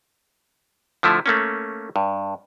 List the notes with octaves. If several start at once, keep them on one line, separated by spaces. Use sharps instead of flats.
D3 F3 A3 E4
A3 A#3 C#4
G2